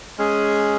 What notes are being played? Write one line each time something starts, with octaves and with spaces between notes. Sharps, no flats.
G#3 C#4 G#4